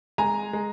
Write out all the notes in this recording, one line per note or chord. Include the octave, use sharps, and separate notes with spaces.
G#3 G#5 A#5
G#3